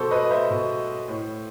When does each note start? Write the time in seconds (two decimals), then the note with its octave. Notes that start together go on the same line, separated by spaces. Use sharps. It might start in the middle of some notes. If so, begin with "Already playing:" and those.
Already playing: B2 A4 C5
0.11 B4 D#5
0.31 C5 E5
0.50 B2
1.08 A2